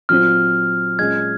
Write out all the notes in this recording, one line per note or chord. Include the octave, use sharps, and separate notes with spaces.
A#2 F#3 C4 F4 C5 F6
A#2 G#3 C#4 G#4 D#5 G#6